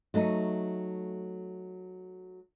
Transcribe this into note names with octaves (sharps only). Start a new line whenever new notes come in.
F#3 A3 D#4